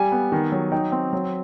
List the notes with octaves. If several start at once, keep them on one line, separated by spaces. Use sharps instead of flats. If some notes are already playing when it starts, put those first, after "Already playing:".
Already playing: G3 G#5
B3
D#3
F#3
D#4 G5
C4
F#3